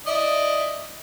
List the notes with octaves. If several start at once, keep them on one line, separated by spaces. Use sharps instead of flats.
E4 D5 D#5